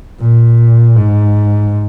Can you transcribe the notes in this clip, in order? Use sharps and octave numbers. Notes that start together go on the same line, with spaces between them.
A#2
G#2